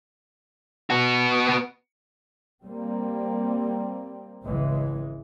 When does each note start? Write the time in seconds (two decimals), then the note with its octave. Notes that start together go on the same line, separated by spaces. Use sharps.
0.90 B3 F#4
2.64 G3 A#3 C4
4.43 G#1 C#2 E3 G#3